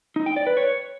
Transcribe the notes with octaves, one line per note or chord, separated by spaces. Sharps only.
D#4
G5
D5
B4
C#5